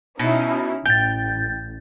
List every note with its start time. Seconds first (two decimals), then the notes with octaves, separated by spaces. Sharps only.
0.19 B2 C#4 D#4 E4
0.86 A1 G5 G6 A6